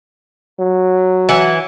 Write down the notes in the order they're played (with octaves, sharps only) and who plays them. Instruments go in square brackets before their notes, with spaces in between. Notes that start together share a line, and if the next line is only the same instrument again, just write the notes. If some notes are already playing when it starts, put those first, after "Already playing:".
[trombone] F#3
[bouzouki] E3 F#5